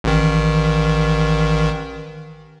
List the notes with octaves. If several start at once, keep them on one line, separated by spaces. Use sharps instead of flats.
A1 D#3